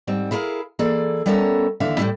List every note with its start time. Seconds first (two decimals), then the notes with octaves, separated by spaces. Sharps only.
0.07 G#2 G3 C4
0.31 E4 G#4 A#4 B4 F5
0.79 E3 A#3 G#4 A4 D5
1.26 G3 B3 C#4 A4 A#4 E5
1.80 D#2 D3 E3 E5 F5
1.98 A2 F3 G3 C#4 E4